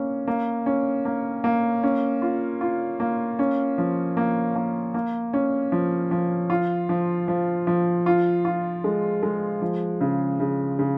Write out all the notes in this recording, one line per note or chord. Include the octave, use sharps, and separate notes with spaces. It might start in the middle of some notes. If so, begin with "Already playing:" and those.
Already playing: A#3 C#4
A#3
C#4
A#3
A#3
C#4
F4
F4
A#3
C#4
F3
A#3
A#3
A#3
C#4
F3
F3
F4
F3
F3
F3
F4
F4
G#3
G#3
F3
C#3
C#3
C#3